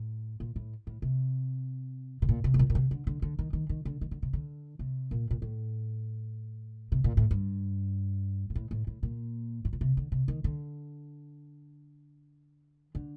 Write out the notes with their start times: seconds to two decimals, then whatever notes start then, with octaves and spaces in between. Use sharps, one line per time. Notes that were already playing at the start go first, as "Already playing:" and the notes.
Already playing: A2
0.40 A#2
0.56 A2
0.87 A2
1.02 C3
2.22 C3
2.29 A#2
2.44 C3
2.54 A2
2.59 A#2
2.70 A#2
2.75 C3
2.91 D3
3.07 D3
3.22 D3
3.39 D#3
3.53 D#3
3.69 D#3
3.85 D3
4.01 D#3
4.11 D3
4.22 C3
4.33 D3
4.79 C3
5.11 A#2
5.31 A#2
5.42 A2
6.92 C3
7.04 A#2
7.17 A2
7.31 G2
8.50 A#2
8.55 A2
8.71 A2
8.87 A2
9.03 A#2
9.65 A2
9.73 A#2
9.81 C3
9.97 D3
10.12 C3
10.28 D#3
10.44 D3
12.95 D3